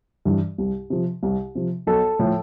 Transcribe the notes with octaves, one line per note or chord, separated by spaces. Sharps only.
G2 E3
C2
C3 F3
C2
C3 F3
B1 A4
A2 F3